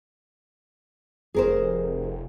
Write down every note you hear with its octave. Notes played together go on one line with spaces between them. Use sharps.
F1 G#4 A#4 C5